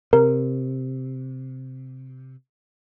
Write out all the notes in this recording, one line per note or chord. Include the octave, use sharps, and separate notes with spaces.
C3 A#4